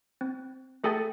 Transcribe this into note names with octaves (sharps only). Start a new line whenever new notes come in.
C4
A3 G#4 A4 G5 A6